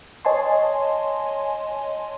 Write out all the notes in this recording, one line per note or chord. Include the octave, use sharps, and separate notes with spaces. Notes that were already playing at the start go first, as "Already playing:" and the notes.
C#5 D#5 G#5 A5 C6